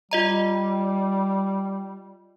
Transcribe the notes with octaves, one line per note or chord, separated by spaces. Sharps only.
G3 F4 D#5 A#5